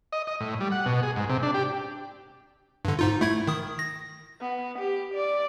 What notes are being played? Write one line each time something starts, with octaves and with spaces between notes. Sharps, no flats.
D#5
D#5
A2
G3
F#5
B2
G#4
G#2
C3
D4
G4
G2 D3
G#2 D#4 F4
A3 E4 G#6
D#3 D#6
A#6
B3
G4
D5